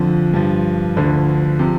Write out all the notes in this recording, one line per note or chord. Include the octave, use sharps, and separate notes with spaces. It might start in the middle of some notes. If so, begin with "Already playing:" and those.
Already playing: F2 D3 F3
G2 F3
D2 D3 F3
C3 F3